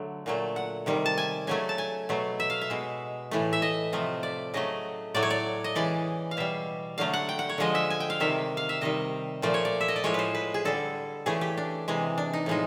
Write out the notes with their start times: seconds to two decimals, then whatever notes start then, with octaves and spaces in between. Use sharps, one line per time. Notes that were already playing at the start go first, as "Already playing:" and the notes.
Already playing: D3 F#3 A3
0.26 A#2 F#3 A3
0.56 F#5
0.86 C3 D#3 G3
1.06 A5
1.18 G#5
1.47 C#3 F#3 A3 G#5
1.69 A5
1.78 G#5
2.09 B2 F#3 A3
2.40 E5
2.50 F5
2.61 E5
2.70 B2 G#3
3.31 A2 E3 A3
3.53 E5
3.62 D#5
3.93 C3 F3 A3
4.23 D5
4.54 C#3 F#3 A3 D#5
5.14 A2 F#3 A3 D5
5.22 C#5
5.30 D5
5.64 D#5
5.75 C#3 E3 G#3 D5
6.31 F5
6.37 B2 G3 E5
6.98 D3 F#3 A3 F5
7.13 F#5
7.29 G5
7.39 F#5
7.49 C#5
7.58 D3 F3 G#3 D#5
7.75 E5
7.90 G#5
8.00 G5
8.10 F5
8.20 C3 D#3 G3 E5
8.57 F5
8.69 E5
8.81 C3 D#3 G3 D#5
9.42 A#2 F3 A3 D5
9.54 C#5
9.65 D5
9.81 E5
9.88 D#5
9.96 D5
10.04 A2 F3 G#3 C#5
10.14 B4 C5
10.35 B4
10.54 G#4
10.65 D3 G3 A4
11.26 C#3 E3 A3 G#4
11.41 G4
11.57 D4
11.88 C3 E3 G#3
12.18 D4
12.33 D#4
12.46 A2 F3 G#3 D#4